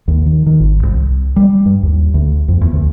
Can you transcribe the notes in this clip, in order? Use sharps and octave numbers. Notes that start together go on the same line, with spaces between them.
D#2
D#3
D#3
G#1
C2
G3
G2
D#2
D2
F2
E2
D2